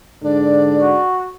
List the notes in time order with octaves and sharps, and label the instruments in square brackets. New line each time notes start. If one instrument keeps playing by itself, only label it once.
[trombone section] G#2 D3 D4 [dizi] D5
[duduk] F#4